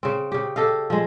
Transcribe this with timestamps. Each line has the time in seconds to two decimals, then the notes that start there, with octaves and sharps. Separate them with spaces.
0.03 C#3 C4
0.32 C#3 G4
0.56 G4 A4 D#5 F5
0.90 F3 G#3